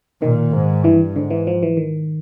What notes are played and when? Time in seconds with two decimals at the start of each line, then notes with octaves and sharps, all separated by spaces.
0.22 A#2 D#3
0.53 G#2
0.84 G2 E3
1.16 G#2 D3
1.30 E3
1.47 F3
1.63 E3
1.77 D#3